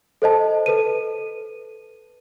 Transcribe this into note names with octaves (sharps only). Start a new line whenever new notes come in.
A4 C5 D#5 A5
A4 B4 D#7